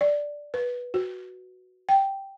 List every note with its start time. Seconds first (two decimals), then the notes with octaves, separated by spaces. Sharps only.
0.01 D5
0.54 B4
0.94 F#4
1.89 G5